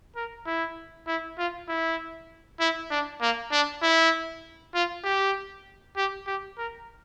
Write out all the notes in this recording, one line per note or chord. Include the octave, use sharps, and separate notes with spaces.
A#4
E4
E4
F4
E4
E4
D4
A#3
D4
E4
F4
G4
G4
G4
A#4